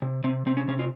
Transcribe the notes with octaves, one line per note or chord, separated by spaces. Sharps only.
C3
C3 C4
C3 C4
C#4
C3 C#4
F4